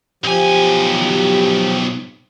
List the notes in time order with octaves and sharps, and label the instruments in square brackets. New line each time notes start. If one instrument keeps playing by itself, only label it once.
[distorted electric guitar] B1 G#5 [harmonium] F3 G4